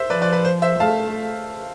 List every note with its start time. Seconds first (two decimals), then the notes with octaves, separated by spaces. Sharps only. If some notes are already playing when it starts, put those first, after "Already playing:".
Already playing: C5 E5
0.10 F3 B4 D5
0.22 B4 D5
0.33 B4
0.45 C5
0.62 C5 E5
0.80 A3 F5 A5